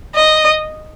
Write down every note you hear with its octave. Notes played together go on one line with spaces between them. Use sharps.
D#5